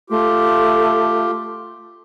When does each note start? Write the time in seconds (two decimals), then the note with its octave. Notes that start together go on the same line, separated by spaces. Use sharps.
0.10 A3 F4 G4